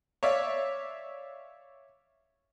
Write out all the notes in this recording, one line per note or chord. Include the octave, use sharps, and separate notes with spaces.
C#5 D5 E5 F5